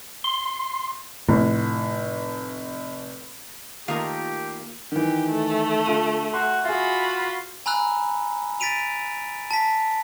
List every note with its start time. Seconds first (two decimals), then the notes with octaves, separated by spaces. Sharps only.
0.24 C6
1.29 F1 A2
3.88 D#3 A3 A#3 F4 G4 A#4 F5 D#6
4.92 D#3 E3 G4
5.29 A3
5.86 D3 F4 D#7
6.34 F#4 C6
6.64 F4 F#4 G#4 E5 B5
7.66 G#5 A#5 B5 E6 F#6
8.60 A6 B6 D7 D#7 F7
9.51 A5 B6